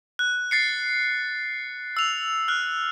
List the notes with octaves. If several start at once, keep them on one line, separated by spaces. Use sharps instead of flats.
F#6
A6 C7 C#7
E6 F7
F6 F#6